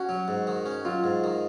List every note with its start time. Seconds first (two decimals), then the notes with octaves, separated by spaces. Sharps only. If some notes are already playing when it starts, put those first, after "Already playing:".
Already playing: C#4 F#4
0.09 F#3
0.28 G#2
0.47 D#3
0.66 C#4
0.85 F#3 F4
1.04 G#2
1.24 D#3